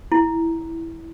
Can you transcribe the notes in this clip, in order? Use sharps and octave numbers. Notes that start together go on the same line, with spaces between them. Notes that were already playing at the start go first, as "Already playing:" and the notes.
E4